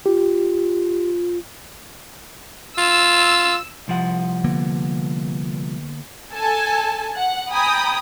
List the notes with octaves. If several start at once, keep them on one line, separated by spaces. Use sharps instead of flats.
F4 G4
F4 E6
C2 F3 F#5
D3 A#3 B3
A4 G#5 A5
F#5
G5 G#5 A#5 B5 D#6